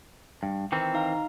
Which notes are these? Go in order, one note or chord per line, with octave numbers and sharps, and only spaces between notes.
G2
D#3 E3 C4
D#4 F5 A#5